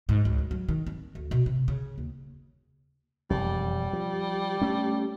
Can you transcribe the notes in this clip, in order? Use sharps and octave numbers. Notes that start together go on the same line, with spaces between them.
G#2
C#2
F#2
F#3
D#3
C4
D2
B2
C3
C#3
D#2
E1 F2 G3
F3
A3 C#4